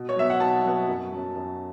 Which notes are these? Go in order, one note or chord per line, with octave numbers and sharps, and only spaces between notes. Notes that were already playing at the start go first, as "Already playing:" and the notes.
Already playing: B2
C#5
F#3 B3 E5
F#5
B2 A5
F#3 B3
F#2
F#3 C#4
F#2